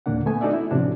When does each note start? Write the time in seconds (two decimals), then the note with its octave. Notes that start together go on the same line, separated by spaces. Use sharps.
0.06 D#2 A#2 D3 A#3 D4 F#5
0.26 A3 B3 G#5
0.41 D4 D#4 F#4 A4 D5 E5
0.53 E4
0.71 A2 C3 F3 C#4 D4 F#4